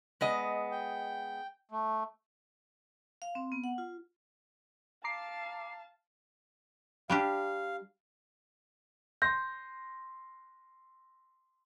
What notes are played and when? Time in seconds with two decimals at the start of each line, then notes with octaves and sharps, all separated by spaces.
0.21 G#3 B3 D#5
0.71 G5
1.71 A3
3.22 F5
3.35 C4
3.52 B3
3.64 F#5
3.78 F4
5.04 F5 A5 A#5 D6 C7
7.10 G3 D4 G4 F5
9.22 C6 G6 A#6